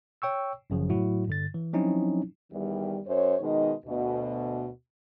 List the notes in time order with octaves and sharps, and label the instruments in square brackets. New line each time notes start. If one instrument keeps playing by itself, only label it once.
[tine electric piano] C#5 G5 C#6 E6
G1 F#2 C#3 F3
A2 F#3 E4 F#4
G2 D3 A6
E3
F3 F#3 C4 C#4 D#4 E4
[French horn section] E2 D#3 G3
F#2 C5 C#5
B2 D#3 G#3 D#4 D#5
D2 B2